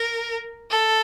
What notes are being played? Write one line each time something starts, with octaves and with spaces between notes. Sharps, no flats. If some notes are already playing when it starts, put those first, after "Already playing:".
Already playing: A#4
A4